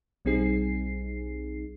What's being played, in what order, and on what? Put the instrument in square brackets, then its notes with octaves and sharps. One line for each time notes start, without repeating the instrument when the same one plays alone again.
[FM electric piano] B1 G3 C4 D#4 G#4 C7